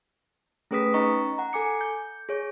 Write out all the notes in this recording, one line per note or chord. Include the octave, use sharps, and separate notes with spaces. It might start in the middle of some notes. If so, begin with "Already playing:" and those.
A3 C#4 G#4 B4 D#6 B6
C#4 D#4 D#5 A#5 C#6
F#5 A#5
A4 G#5 D6 C#7
G6
G#4 C#5